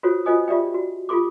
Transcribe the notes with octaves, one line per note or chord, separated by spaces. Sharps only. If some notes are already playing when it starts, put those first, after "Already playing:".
F4 F#4 A4 C5 C#5
F4 A4 C5 D#5 G#5 D#6
F4 G4 D5 E5 G5
F#4
F4 G4 A4 C6 D6